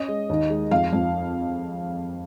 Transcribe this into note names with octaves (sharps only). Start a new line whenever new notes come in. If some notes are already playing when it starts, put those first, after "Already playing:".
Already playing: C#4 D#5
G#3
D#2
G#3
F2 F5
F2